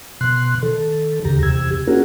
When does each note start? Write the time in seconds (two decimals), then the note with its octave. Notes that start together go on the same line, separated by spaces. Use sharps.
0.21 B2 C6 F#6
0.63 D#3 A4
1.25 D#2 C#3 G4 A#5
1.43 E2 C3 G4 E6 G#6
1.87 A#3 C#4 F4 F#4 G#4 A#4